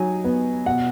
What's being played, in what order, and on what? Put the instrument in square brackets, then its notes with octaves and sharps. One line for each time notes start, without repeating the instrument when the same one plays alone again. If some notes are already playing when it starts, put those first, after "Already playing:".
Already playing: [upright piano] F#3 D#4 G#5
B3
B2 F#5